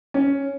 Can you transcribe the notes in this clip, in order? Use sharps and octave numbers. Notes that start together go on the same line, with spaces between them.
C#4